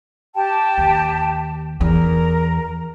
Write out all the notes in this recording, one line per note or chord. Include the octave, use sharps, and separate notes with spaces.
G4 G5 A5
D#2
E2 A#4